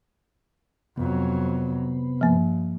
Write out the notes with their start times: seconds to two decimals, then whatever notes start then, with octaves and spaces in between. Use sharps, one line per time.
0.98 F2 C3 F#3 B3
2.21 G2 F3 A#3